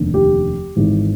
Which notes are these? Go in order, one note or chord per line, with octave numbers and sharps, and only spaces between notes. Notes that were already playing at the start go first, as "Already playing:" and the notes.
Already playing: F1 D#2 D3
G4
G#1 G#2 E3